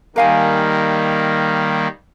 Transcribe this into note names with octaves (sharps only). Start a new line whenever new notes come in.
D#3 G3 A#3 A#4 F5 G#5